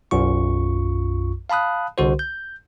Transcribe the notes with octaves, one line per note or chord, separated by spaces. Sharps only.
B1 F#2 F4 C#6
F5 A5 B5 D#6 F#6
C2 D3 F#4 C5
G6